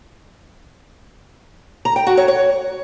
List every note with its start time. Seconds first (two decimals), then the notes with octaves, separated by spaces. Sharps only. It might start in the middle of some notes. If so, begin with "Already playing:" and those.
1.85 A#5
1.96 G5
2.07 F#4
2.17 C#5
2.28 C#5